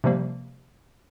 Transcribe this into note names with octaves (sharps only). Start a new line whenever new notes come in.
C3 F3 G3 A#3